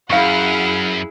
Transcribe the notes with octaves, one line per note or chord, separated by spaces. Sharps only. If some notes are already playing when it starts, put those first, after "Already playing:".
F#2 E4 G#4 F5 F#5 B5 C#6 F6